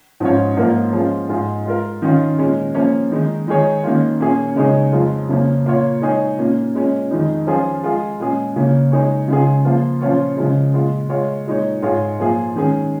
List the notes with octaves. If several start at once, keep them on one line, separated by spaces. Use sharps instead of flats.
G#2 F3 C#4 F4 C#5
G#2 F3 A#3 F4 A#4
F3 G#3 C#4 F4
G#2 G#3 F4 G#4
G#3 F4 A#4
D#3 C#4 F4
A#2 G#3 C#4
F3 A#3 C#4
D#3 G#3 D#4
D#3 G#3 D#4 G#4 C#5
D#3 A#3 C#4 F4
A#2 A#3 C#4 G#4 C#5
C#3 G#3 D#4 G#4 C#5
F2 F3 G#3 F4
F2 C#3 F3 A#3 C#4
A#2 A#3 F4 C#5
G#3 D#4 G#4 C#5
A#2 A#3 C#4
A#2 G#3 C#4
F2 D#3 G#3 D#4
F3 C#4 F4 G#4
G#3 F4 G#4
A#2 G#3 C#4 G#4
C#3 A#3 C#4
G#3 D#4 G#4 C#5
C#3 G#3 F4 G#4
F3 A#3 F4
A#2 F3 C#4 F4 C#5
C#3 F3 G#3
A#2 G#3 F4
G#3 F4 C#5
A#2 G#3 D#4 C#5
G#2 G#3 F4 G#4 C#5
A#2 F3 A#3 F4 G#4
D#3 G#3 C#4 G#4